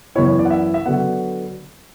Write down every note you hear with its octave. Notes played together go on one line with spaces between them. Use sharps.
F#2 E3 B3 E4 C#5
C#5
D5
F#5
E5
E5
D3 F#3 B3 F#5